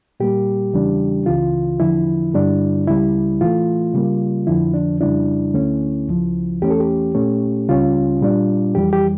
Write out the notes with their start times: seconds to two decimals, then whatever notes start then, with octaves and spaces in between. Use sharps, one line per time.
0.20 A#2 G3 A#3 G4
0.74 E2 C#3 E3 G3 D4
1.26 C#2 C#3 E3 F4
1.80 E2 D3 F3 E4
2.34 G2 D3 G3 D4
2.87 C#2 C#3 G3 E4
3.41 A2 E3 A3 F4
3.94 C#3 G3 A#3
4.47 F2 D3 F3 E4
4.74 D4
5.01 F2 C#3 G3 D4 E4
5.54 D2 D3 A3 C#4
6.09 C#2 C#3 F3
6.62 E2 E3 A3 C#4 G4
6.70 A4
6.80 G4
7.14 A#2 A3 C#4
7.69 C#2 C#3 G3 C#4 F4
8.22 A#2 G3 D4
8.75 F2 E3 G3 G4
8.93 G4